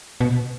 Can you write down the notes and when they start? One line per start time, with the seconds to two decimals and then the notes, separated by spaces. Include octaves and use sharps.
0.21 B2